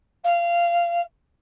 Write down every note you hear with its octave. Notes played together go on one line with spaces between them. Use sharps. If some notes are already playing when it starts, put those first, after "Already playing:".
F5